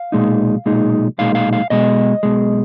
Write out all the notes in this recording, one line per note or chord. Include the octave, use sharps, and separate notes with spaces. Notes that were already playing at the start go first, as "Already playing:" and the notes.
Already playing: F5
B1 A#2 G#3 D#4
B1 A#2 G#3 D#4
B1 A#2 G#3 D#4 F5
F5
F5
B1 B2 G#3 D#5
B1 B2 G#3